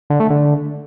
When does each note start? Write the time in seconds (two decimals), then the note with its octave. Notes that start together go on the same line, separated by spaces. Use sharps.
0.10 D3
0.20 A3
0.30 D3